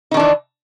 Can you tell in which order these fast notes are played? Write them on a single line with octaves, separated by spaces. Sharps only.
D#4 D#3 D4 E3